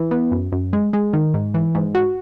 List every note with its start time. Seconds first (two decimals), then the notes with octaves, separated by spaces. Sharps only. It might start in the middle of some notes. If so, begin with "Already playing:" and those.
Already playing: E3
0.11 B3
0.31 F#2
0.52 F#2
0.73 G#3
0.93 G#3
1.13 D#3
1.34 G#2
1.54 E3
1.75 G#2
1.95 F#4